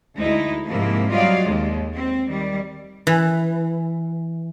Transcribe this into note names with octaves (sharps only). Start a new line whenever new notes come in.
D2 G#3 D#4 E4
G#2 C3 F3 A#3 E4
F#3 G3 F4 D5 D#5 F5
D#2 G#3
C4
D#3 G3
E3